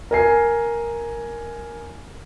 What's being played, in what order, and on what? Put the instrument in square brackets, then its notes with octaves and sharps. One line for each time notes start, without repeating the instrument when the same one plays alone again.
[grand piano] A#4 G#5 C7